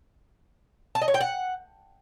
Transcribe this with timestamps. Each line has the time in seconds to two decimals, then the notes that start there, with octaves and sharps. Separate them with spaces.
0.95 A5
1.02 D#5
1.08 C#5
1.14 G5
1.20 F#5